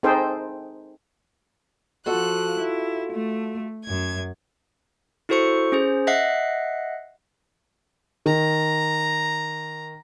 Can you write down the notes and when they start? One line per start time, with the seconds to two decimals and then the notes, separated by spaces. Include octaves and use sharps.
0.03 C4 D#4 G#4 A4 C5 G5
2.06 F3 F4 F#4 A4 F#6
2.58 E4
3.12 A3
3.85 F#2 G#6
5.29 E4 F#4 A4 C5 C#6 C#7
5.72 C#4 G#4 C5
6.07 D#5 E5 F#5 F#6 C7
8.26 D#3 A#5